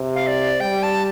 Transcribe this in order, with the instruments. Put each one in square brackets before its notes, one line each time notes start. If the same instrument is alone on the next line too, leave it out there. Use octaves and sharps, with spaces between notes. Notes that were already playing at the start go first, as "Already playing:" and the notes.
Already playing: [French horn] C3
[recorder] F5
D5
[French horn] G3 [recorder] G5
[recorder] A5